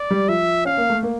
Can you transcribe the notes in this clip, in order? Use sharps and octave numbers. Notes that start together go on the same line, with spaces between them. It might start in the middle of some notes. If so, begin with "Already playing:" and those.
Already playing: D5
G3
F3 E5
C#4 F5
A#3
A3
A#3